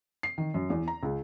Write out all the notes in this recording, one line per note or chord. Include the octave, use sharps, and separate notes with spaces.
C7
D#3
F#2
E2
A#5
C#2